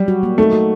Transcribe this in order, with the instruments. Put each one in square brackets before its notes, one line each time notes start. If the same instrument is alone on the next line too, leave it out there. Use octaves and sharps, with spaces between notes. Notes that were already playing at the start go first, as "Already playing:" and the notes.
Already playing: [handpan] F#3 [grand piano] G3
[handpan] F#4
A#3
[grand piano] A3 [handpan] D#4
[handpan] F#4